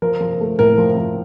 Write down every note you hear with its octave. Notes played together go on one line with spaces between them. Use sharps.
F3 A#4
F3
A3
A2 A#4
F3
F3